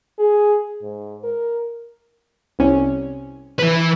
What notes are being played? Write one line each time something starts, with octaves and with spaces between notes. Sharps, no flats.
G#4
G#2
A#4
C2 C#4
E3 B4